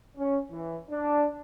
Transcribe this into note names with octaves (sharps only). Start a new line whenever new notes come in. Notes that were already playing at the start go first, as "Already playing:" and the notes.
C#4
E3
D4